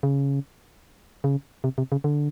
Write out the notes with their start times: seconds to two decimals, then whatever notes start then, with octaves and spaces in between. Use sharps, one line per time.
0.03 C#3
1.24 C#3
1.64 C3
1.78 C3
1.92 C#3
2.04 D3